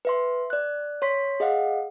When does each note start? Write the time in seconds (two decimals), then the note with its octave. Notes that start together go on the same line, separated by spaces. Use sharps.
0.05 B4 E5 C6
0.50 D5 F#6
1.02 C#5 C6 B6
1.40 G#4 D#5 F5 F#5